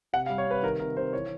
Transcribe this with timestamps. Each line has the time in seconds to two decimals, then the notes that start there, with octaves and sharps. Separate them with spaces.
0.13 C3 F#5
0.26 F5
0.29 G3
0.38 C#5
0.47 C3 B4
0.63 D#3 A#4
0.79 C3 A#4
0.97 C3 C5
1.13 E3 C#5